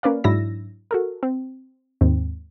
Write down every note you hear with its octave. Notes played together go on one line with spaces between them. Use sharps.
A#3 C#4 B4 D5 F5
G#2 F#3 D4 E4 E6 A#6
F#4 A4 A#4
C4
D#2 G#2 C4